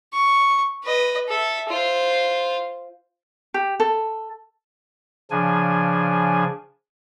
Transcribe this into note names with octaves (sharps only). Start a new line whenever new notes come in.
C#6
B4 D#5
A4 E5
F4 C5
G4
A4
C#3 F3 D4 G#5